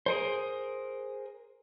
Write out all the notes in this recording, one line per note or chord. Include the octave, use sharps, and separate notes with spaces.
G#4 A#4 C5